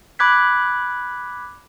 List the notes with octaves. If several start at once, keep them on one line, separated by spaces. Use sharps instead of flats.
B5 D6 F#6 G#6 B6